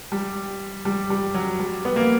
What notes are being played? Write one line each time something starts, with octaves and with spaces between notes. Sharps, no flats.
G3
G3
G3
F#3
G3
B3
A#3